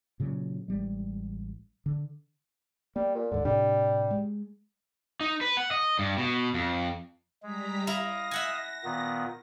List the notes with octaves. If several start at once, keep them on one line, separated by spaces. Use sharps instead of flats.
A#2 C#3 F#3
A1 G3 G#3
D3
G3 A#3
A#2
D#2 G#2 D3
A2 C3 G3 D4
G#3
D#4
B4
F#5
D#5
G2
B2
F2
G3 G#3 A#5 B6
E4 D#5 F5 A#5 A#6
E5 F#5 G#5
A#2 D#3 B3